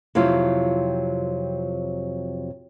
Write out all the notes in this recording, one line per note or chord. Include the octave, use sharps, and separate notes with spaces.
F2 C3 F#3 E4 F4